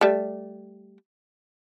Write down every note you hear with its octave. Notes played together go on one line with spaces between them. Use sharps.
G3 A3